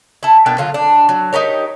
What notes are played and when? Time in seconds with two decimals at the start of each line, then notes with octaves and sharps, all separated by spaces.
0.23 E4 A4
0.46 B2 A#3 D4 G5
0.58 D3 F#3 F4
0.74 D4
1.09 F#3
1.33 D#4 G4 A#4 C#5